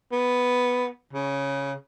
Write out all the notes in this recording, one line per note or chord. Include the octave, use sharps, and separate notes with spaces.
B3
C#3